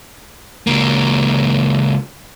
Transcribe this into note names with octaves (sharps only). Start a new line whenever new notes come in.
C#2 A#3